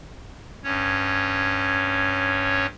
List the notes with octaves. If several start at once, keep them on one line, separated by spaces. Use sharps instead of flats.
G2 C#4 C#5